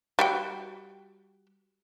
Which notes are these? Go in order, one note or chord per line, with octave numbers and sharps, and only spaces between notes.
G3 F#4 G5